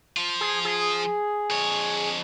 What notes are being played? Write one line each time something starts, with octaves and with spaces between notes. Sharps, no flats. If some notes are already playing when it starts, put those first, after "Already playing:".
F3 F4
G#4
G#4
F2 C#5